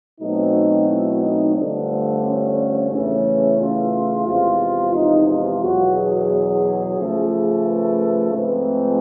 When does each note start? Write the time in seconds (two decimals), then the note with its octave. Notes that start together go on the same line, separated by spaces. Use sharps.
0.21 B2 F#3 A3 C4 D#4
0.89 E4
1.22 D#4
1.56 G2 D3 F3 A3 D4
2.23 C#4
2.91 E2 C#3 E3 A3 C#4
3.60 F4
4.26 E2 C3 F3 G#3 F4
4.94 D#4
5.28 F4
5.62 E2 B2 F#3 F#4
5.96 G#4
6.97 C#3 F3 A3
7.65 B4
8.33 G#2 F3 A3 C4 B4